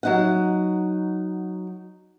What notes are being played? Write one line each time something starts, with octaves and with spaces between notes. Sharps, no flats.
F#3 D#4 F#5